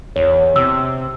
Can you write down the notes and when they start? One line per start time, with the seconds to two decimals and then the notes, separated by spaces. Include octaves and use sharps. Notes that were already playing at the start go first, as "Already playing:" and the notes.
0.16 E2 C#5
0.56 C3 E6